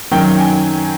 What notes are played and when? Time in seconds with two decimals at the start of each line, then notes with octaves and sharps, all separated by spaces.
0.11 F#2 D#3 F#3 G5
0.40 G#5